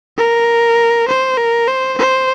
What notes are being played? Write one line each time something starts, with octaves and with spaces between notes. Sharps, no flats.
A#4
C5
A#4
C5
C5